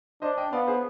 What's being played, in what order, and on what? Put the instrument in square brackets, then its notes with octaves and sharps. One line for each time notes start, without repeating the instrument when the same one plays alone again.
[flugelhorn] D4 [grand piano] C5 D#5
[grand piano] D#5 G5
[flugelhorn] B3 [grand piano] D5 F5
[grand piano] G#4 C5